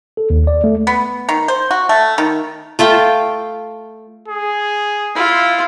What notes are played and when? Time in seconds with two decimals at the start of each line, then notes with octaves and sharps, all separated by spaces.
0.17 A4
0.30 D#2
0.47 D5
0.64 A3
0.87 B3
1.29 D#3
1.48 C5
1.71 F#4
1.89 A3
2.18 D#3
2.79 A3 F4 G5 A5
4.28 G#4
5.15 E4 F4